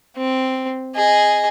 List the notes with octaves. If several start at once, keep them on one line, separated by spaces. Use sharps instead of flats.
C4
G#4 D#5